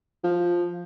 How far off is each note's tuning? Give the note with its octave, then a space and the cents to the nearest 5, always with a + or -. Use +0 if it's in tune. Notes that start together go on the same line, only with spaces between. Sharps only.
F3 +5